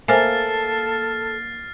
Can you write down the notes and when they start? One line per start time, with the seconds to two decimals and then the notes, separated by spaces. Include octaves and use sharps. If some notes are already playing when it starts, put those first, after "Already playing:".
0.08 A#3 A4 C5 E5 G#5 F6 A6 C7